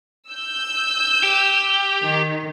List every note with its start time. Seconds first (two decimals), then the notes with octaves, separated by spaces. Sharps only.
0.31 E6 G6
1.23 G4
2.04 D#3